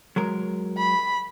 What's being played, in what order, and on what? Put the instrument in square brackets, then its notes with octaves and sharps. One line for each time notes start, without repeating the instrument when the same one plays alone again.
[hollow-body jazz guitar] F#3 G#3 A#4
[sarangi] B5